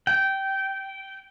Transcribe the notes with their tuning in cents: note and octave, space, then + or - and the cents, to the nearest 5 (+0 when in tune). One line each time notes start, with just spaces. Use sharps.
G5 -15